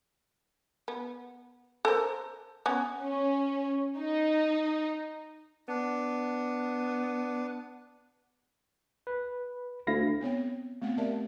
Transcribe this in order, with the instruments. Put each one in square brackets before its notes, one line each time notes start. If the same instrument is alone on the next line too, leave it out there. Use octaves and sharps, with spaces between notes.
[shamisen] B3
A4 A#4 C5
B3 C#4
[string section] C#4
D#4
[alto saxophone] B3 [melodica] D4
[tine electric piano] B4
[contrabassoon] D2 [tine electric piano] E4 F5 A#6
[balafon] B3 C4 C#5 G5
A3 B3 C4 F#5
G4 A#4 D5 E5 A5